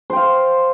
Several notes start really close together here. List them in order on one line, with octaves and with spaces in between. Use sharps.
C5 G5 F5